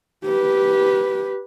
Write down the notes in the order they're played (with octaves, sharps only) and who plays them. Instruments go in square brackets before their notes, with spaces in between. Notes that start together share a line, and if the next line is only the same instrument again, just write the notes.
[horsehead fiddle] G4 B4